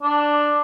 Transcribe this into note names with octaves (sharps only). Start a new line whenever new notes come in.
D4